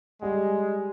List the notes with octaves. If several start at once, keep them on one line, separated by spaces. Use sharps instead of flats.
G3 G#3